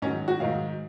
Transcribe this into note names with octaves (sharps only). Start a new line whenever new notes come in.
G#2 D#3 F#3 C#4
F#4
G#2 D#3 F#3 F5